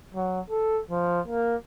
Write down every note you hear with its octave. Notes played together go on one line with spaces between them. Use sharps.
F#3
A4
F3
A#3